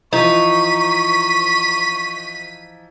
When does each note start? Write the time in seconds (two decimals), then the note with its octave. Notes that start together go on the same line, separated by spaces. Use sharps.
0.13 E3 F3 D#4 C#6 B6 D#7